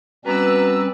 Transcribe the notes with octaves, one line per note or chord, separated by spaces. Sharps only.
B2 G3 C4 C#4 B4 D5 A#5 E6